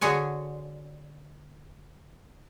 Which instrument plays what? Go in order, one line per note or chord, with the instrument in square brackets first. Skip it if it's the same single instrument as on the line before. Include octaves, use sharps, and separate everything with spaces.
[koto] D3 F#4 G#4 C#5 G#5